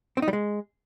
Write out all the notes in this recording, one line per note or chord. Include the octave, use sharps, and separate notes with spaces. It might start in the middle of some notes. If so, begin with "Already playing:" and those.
C4
D#4
G3
G#3